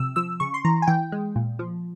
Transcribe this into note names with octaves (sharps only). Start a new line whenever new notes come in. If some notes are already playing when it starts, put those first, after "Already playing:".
Already playing: C3 F3 E6
F3 E6
C#3 C#6
C6
E3 A#5
G#5
E3 G5
G#3
A#2
F3